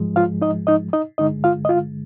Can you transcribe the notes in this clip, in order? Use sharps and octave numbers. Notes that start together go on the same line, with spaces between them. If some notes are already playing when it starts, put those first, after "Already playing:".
Already playing: G#2 F3 G#3
F4 F5
D#4 D#5
D#4 D#5
D#4 D#5
G2 D3 G#3 D#4 D#5
F4 F5
D#5
F4 F5